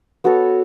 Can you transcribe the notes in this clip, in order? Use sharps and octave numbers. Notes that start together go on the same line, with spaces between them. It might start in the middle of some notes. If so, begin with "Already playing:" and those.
B3 F#4 A4 C#5